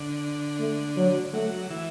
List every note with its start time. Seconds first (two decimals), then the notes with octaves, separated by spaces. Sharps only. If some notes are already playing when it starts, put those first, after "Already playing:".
Already playing: D3
0.60 A3
0.97 F#3
1.33 F#3 A3
1.70 E3